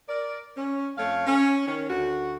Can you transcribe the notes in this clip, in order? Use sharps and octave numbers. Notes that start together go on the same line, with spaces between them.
A#4 D5
C#4
F2 A3 C#5 F5
C#4
D#3 C#4
D2 F#4